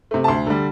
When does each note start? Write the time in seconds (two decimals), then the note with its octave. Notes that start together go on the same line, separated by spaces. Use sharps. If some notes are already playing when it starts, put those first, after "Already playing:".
0.11 C3 A3
0.24 A5
0.28 D2 C6
0.46 D3 G3